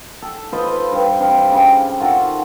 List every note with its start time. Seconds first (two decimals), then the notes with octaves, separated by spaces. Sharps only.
0.22 A4
0.52 F4 B4 C5 D#5
0.92 G2 F5
1.19 C3 D4 C5 F5
1.52 C#3 G5
1.99 D#3 F4 F#4 A4